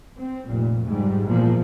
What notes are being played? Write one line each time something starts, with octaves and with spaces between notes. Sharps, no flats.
C4
F1 A#2
G#2 G3
E2 A#2 F3 A#3